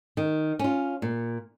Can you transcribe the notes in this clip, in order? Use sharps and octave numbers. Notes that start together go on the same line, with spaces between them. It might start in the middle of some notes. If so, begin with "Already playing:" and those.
D#3
C#4 F4
A#2